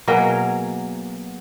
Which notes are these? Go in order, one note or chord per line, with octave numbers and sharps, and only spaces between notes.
B2 F#3 A#3 G#4